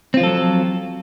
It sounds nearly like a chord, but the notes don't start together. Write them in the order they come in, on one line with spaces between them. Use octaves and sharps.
C4 F4 F3 A4 F#3